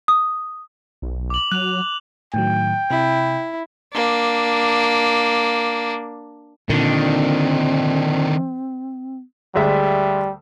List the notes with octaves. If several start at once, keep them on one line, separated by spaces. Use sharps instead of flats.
D#6
B1
D6 F#7
F#3 F#6 F7
A2 D#3 F#3 G5
C3 E4
A#3 D4
A#2 D3 D#3 C4 D4
D2 G3 G#3 E5